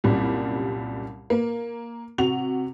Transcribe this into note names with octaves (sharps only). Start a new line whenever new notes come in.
C2 F#2 A#2 G3
A#3
C3 F#4 F7